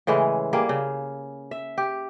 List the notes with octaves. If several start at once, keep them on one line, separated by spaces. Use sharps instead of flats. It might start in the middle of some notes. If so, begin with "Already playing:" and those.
A2 C#3 E3 G#3
G3 A#3 G#4
C#3
E5
G4